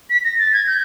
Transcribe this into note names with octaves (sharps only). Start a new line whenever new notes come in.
B6
A#6
A6
G#6
G6